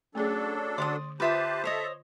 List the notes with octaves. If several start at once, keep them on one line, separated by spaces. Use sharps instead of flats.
F#3 A3 C#4 D4 G#4 A4
D3 D5 C6 D#6
F4 G4 B4 C5 E5 A5 C6 D#6
A4 C5 C#5 D#5 E5